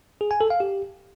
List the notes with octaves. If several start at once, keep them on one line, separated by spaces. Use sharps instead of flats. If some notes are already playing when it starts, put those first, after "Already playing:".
G#4
G#5
A4
F5
G4